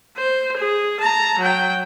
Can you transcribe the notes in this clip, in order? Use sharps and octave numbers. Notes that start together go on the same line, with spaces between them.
C5
G#4
A5 A#5
F#3 G5